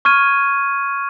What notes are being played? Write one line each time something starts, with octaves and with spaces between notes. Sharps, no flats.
C#6 F6 G#6 D#7